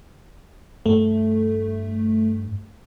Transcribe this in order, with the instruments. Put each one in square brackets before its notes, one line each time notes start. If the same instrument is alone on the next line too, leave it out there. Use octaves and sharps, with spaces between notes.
[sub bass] G2 [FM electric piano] A3